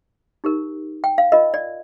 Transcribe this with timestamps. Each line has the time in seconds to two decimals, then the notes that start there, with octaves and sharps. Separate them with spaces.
0.44 D#4 G4 A#4
1.04 G5
1.18 F5
1.32 F4 A#4 D#5
1.54 D5